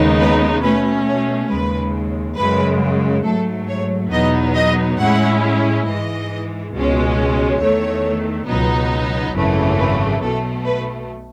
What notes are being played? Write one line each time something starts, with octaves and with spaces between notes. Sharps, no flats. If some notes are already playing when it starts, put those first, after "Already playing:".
Already playing: D#2 C#3 G#3 B3 D#4
B4
B2 A3 C#4 B4
C#5
D#2 C#3 G#3 B4
F#2 C#3 G#3 B4
G#2 F#3 A3 A4
C#5
E2 B2 F#3 B3 D#4 D#5
D#5
A2 G#3 C#4 E4 F#5
G#2 E3 G#3 D#5
C#2 B2 G#3 C#4
E2 D#3 A3 C#5
C#2 B2 F#3 B3 D#4
G#1 F#2 C#3 E3 A3
B4
B1 B2 A3 A4
B4